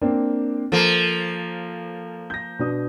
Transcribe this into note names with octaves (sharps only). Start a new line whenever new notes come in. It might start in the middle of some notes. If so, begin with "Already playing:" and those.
A#3 C4 D4
F3 A#3 A4
G6 A#6
B2 D4 D#6